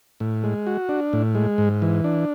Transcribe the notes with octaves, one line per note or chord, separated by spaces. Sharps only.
A2
G#3
F#4
D4
A2
G#3
G#2
E3
D4